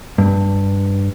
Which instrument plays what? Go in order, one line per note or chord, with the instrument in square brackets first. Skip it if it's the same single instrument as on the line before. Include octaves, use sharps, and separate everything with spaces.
[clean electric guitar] G2